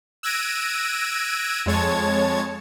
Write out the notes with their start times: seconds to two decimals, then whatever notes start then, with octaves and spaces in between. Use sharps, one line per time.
0.23 E6 F#6 G#6 A#6 D7 D#7
1.66 F2 G#3 C#5 A5 G#6